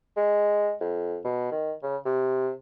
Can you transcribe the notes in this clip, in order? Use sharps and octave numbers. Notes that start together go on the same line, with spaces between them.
G#3
F2
B2
D#3
C#3
C3